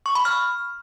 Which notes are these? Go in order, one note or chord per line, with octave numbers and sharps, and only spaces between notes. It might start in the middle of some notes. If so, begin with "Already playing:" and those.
C#6
B5
F6